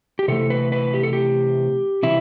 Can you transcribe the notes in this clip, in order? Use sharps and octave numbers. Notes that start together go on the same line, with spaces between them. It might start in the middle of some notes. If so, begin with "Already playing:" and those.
G4
C3 E3 A3 A4
B4
B4
G4
A4
G4
C3 E3 E4